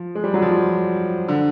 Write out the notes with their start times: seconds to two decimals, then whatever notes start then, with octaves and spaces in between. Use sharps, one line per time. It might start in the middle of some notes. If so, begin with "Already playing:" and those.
Already playing: F3
0.15 G#3
0.24 G3
0.34 F#3
0.42 F3
1.28 D3